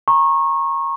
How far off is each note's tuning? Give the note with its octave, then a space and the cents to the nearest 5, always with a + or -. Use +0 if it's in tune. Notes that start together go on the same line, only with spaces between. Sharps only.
A#5 +0 C#6 -25